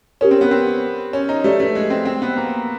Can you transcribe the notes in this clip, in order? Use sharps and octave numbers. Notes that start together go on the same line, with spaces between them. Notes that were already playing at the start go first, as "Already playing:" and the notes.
C#4 G4 A#4 C#5
C4
B3
C4
C#4
D#4
A3 G4 B4 D5
A3
G#3
C4
C4
B3
A#3